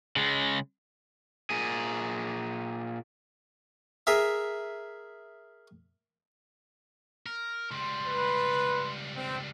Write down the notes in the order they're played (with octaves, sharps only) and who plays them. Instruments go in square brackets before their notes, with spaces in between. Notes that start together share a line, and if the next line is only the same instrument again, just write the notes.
[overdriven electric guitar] C#3 G#3
A#2 G#4
[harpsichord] G#4 A#4 E5
[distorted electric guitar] A#4
[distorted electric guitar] C#2 G3 [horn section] C6
[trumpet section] B4
C4